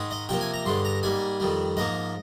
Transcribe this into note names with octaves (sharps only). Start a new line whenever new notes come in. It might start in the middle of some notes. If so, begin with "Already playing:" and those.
Already playing: G#2 D#3 G#3
D#5
C3 F3 A#3 G5
G#5
A#5
G2 D3 G#3 C6
A#5
G#2 G3 A#3 G#5
F2 D#3 G3
G#2 F3 A#3 D#5